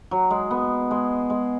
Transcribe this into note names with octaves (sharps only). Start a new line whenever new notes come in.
F#3
G#3
B3
G#3
G#3